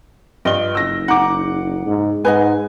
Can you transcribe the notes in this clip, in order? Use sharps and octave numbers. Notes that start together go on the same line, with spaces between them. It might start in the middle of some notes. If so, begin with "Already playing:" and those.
G2 F4 D#5 G7
F#1 E6 A#6
D#4 F#5 D6
G#2
G#2 B4 D#5 F#5 G#5